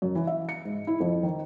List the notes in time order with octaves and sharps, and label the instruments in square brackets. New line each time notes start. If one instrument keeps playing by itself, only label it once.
[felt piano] F#2
E3
E5
C#7
G#2
E4
F2
D#3